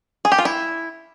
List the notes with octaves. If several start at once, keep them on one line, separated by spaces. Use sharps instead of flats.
G#4
G4
F4
E4